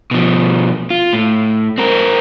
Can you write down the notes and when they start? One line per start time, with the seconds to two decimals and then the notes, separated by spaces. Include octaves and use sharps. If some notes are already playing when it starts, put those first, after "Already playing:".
0.11 B2 F3
0.90 F4
1.13 A2
1.78 C4 A#4